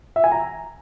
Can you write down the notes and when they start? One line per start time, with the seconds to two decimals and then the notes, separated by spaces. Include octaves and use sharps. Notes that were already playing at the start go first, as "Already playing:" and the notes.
0.16 E5
0.24 G#5
0.32 A#5